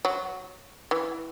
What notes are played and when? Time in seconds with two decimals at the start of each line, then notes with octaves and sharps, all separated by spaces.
0.05 F#3
0.91 E3